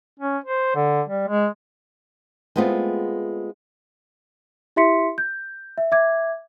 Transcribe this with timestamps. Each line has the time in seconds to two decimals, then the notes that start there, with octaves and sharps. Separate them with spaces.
0.20 C#4
0.44 C5
0.75 D3
1.09 G3
1.28 G#3
2.56 G#3 A3 B3 C4 F4
4.76 E4 G4 E5 C6 B6 C#7
5.18 G6
5.78 E5
5.92 E5 D6 G#6